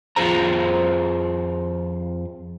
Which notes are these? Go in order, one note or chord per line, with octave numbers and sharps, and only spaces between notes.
F2 D#3 F4 G#4 C5 A#5